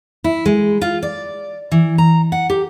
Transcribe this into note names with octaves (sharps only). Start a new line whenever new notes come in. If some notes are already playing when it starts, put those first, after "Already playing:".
E4
G#3
F4
D5
E3
A#5
F#5
G4